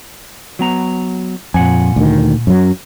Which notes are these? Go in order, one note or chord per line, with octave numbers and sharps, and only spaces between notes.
F#3 B3 A#5
F2 A#2 F#5 G#5
D2 D#3
F#2 F#3